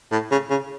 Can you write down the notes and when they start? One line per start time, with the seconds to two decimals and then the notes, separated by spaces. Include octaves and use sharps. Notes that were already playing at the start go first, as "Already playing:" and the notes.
0.12 A2
0.31 C#3
0.50 C#3